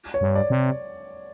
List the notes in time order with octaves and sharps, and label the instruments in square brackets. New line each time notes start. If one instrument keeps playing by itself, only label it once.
[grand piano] C#5
[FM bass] G2
[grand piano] D5
[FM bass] C3